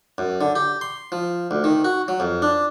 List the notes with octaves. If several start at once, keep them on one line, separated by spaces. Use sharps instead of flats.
F#2
D3
G4
C6
F3
D2
D#3
F#4
F#3
F2
D4